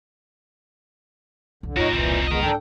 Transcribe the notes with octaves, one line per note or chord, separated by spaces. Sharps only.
C2 F2 D3
F2 A2 D#4 F4 F#4 A#4 C#5 A#6
E1 C2 A#2 E3 C4 D#4
G#3 B3 A#4 D#5
G#2 D4 E4 A4 G5